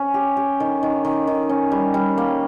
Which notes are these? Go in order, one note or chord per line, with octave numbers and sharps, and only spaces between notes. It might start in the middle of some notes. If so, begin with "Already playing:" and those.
Already playing: C#4
G4
G4
D#3
D#3
D#3
D#3
C#4
G3
G3
A#3